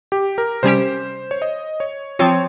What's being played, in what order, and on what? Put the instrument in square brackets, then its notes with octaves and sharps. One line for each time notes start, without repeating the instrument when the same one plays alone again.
[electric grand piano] G4
A#4
[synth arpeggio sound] C3 G3 C#4 G4 [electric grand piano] C5
[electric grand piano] C#5
D#5
C#5
[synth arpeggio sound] F3 C4 F4 [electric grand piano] C#5